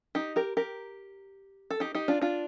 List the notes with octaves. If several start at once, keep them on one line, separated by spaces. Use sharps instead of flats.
D#4 G4
G4 A#4
G4 A#4
A4
D#4 G4
D#4 G4
D4 F4
D4 F4